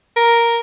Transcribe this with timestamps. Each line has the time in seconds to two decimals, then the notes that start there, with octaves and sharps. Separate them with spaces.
0.16 A#4